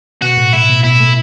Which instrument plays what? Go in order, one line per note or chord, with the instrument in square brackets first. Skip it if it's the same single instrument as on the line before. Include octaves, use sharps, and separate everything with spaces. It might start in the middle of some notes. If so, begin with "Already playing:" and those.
[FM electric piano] B2 [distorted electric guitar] F#4
[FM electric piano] A2
[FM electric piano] A2 [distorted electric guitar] E4
[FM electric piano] B2
[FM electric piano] B2 [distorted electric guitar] E4
[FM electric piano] A3